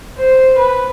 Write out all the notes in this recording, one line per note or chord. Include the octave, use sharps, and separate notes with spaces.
C5
B4